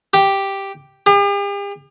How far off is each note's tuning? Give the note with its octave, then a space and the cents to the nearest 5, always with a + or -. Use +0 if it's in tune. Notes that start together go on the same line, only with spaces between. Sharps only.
G4 +0
G4 +45